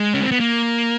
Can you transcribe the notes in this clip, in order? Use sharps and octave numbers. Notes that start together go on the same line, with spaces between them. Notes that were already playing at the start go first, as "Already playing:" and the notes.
Already playing: G#3
C#4
C4
B3
A#3